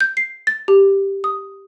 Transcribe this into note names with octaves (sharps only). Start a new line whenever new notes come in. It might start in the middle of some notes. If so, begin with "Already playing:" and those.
G6
C7
A6
G4
D#6